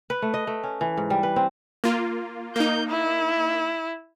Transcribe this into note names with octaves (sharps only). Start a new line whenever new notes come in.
B4
A3
D#5
A3
C#4
E3
G#2
G3
B4
C4
A#3 F4
A#3 D#4 G6
E4